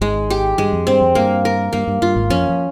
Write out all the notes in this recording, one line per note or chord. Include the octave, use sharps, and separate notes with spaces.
G#1 G#2 G#3
G4
G2 G#3
F2
G2 C4
F2
G2 A#3
A#4
G2 A#3
G2
G2 F4
G#1 G#2
F2 F3 C#4
F3